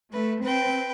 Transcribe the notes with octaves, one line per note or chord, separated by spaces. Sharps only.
A3 B4
C4 B4 G5